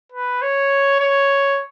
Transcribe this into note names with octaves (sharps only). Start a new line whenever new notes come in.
B4
C#5
C#5